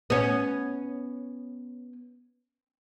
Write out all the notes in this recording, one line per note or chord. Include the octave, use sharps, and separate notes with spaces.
B3 C#4